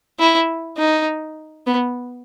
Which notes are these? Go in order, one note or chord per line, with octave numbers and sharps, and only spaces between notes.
E4
D#4
B3